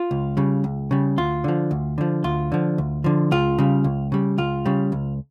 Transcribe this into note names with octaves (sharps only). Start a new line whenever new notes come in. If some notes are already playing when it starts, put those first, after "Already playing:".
Already playing: F4
C#2
C#3 G3
C#2
C#3 G3
D2 F4
D3 F3
D2
D3 F3
D2 F4
D3 F3
D2
D3 F3
C#2 F4
C#3 G3
C#2
C#3 G3
C#2 F4
C#3 G3
C#2